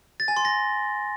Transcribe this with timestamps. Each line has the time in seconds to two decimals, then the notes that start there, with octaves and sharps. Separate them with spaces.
0.20 A6
0.28 G#5
0.37 C6
0.45 A#6